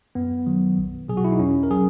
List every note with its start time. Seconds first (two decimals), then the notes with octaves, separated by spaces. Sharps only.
0.15 F#2 B3
0.46 D#3 F#3
0.78 B1
1.08 B2 F#3 G#4
1.17 F#4
1.24 E4
1.32 D#4
1.39 E2 C#4
1.63 A#4
1.71 F#3 G#4